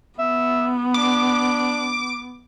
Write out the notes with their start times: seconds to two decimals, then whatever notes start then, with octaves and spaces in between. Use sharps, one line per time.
0.19 B3 E5
0.94 D4 D6